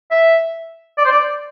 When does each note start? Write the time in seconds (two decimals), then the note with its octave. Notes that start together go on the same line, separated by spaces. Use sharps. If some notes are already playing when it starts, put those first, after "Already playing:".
0.11 E5
0.98 D5
1.05 C5
1.11 D5